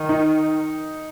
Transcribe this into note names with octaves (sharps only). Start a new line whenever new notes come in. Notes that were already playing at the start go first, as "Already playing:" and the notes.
Already playing: D#3
D#4